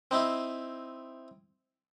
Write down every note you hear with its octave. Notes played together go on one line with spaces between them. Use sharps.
C4 D#4 E4